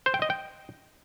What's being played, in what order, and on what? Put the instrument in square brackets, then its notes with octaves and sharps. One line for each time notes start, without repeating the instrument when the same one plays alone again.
[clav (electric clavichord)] C5
G5
D#5
G5